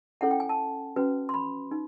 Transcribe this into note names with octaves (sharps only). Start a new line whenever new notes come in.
C#4 E4 A4 C#5 F#5
G5
G#5
A5
C#4 F#4 B4
C6
B5
D#4